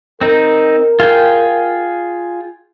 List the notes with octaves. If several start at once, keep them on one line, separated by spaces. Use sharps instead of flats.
C4 D#4 A#4
F4 G#4 G5